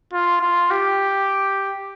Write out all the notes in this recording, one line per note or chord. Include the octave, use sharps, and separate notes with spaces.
F4
F4
G4